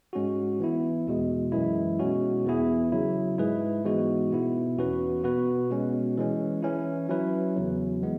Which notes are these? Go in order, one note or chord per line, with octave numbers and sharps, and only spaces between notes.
G#2 G#3 C#4 F#4
E3 B3 E4
E2 B2 G#3
F#2 E3 G#3 E4
B2 G#3 C#4 F#4
E2 E3 B3 E4 G#4
C#3 F#3 E4
G#2 G#3 E4 G#4 B4
G#2 E3 G#3 B3 F#4
B2 B3 E4
E2 E3 C#4 F#4 B4
B2 B3 F#4 B4
B2 G#3 C#4
E3 G#3 C#4
E3 C#4 E4
F#3 C#4 E4 B4
E2 C#3 F#3
E3 G#3 B3